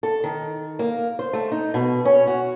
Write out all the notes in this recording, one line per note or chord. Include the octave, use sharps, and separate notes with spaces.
A4
D#3
A#3
C5
A3
D#4
B2
C#4
F#4